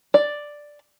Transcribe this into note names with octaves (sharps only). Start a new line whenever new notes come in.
D5